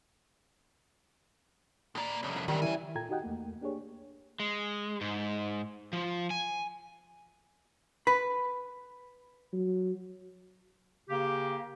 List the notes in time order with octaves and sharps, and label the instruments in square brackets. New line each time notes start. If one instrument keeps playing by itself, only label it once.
[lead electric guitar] A2 A#3 [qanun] B4 D5
[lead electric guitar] C2 F2 [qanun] C#4
[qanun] F#5 B5 C#6
[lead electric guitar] G#2 E3 [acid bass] D#3 [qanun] G3
[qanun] E3 [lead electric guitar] F#3 G#5
[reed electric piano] A#2 F4 A4 G5 A#5 G#6
D#4 F#4 G4 D#5 F#5 G5
E2 A3 A#3
A#3 D4 G4 G#4 C#5
[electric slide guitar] G#3
G#2
F3
G#5
[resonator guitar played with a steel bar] B4 [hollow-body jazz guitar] B5
[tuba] F#3
[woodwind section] C#3 A#3 G4